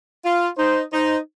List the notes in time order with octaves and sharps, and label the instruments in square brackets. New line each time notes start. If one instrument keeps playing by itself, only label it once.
[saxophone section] F4
[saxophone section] D#4 [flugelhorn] C5
[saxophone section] D#4 [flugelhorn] C5